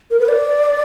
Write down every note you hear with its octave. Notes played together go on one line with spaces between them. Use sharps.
A#4
B4
D5